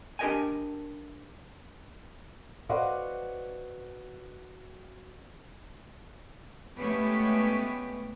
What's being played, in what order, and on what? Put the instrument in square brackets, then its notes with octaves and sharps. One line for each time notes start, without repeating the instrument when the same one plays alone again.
[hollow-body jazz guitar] D4 G4 A#4 D#5 G5 G#5
[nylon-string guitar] F#4 B4 C5 D5 D#5 F5
[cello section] G#3 A3 B3 C#4 G4 B4